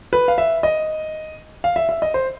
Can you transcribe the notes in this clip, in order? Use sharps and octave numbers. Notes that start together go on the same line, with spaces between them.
B4
F5
E5
D#5
F5
E5
E5
D#5
C5